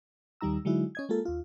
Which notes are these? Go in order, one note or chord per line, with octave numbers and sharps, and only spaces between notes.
D#2 D#3 G3 D#4 A#5 E6
D3 F#3 G#3 D#4 E4 F#4
C#4 D#5 G#6
G#3 A#3 F4 A4
D#2 F4